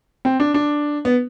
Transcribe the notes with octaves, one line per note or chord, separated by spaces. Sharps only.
C4
D4
D4
B3